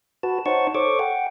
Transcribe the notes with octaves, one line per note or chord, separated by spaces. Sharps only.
F#4 B4 A5
D#4 C5 C#5 F#5 A5 C#6
A4 C5 C#5 C#6 D6
F#5 G5